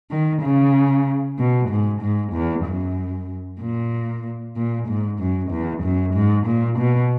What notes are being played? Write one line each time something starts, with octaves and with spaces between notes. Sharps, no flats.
D#3
C#3
B2
G#2
G#2
E2
F#2
A#2
A#2
G#2
F#2
E2
F#2
G#2
A#2
B2